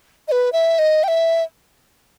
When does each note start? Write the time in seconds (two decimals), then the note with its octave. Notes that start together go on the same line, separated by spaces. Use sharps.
0.28 D#5
0.32 B4
0.53 E5
0.79 D#5
1.04 G5
1.08 E5